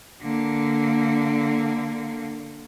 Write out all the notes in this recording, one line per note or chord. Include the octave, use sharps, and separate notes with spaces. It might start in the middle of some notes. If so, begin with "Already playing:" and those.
D3 A#3